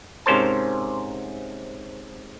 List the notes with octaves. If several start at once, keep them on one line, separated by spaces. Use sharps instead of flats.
G#2 C3 C#4 A#4 C5 A5